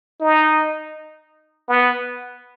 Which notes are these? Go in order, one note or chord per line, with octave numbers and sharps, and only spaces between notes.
D#4
B3